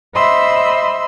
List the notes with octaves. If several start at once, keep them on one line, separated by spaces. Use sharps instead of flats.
C5 D#5 E5 B5 C6 E6